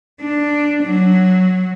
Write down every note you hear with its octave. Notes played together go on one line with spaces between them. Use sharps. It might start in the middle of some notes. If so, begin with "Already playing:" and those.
D4
F#3